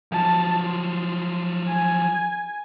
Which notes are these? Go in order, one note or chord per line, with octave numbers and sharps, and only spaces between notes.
F3 F#3 A5
C6
G#5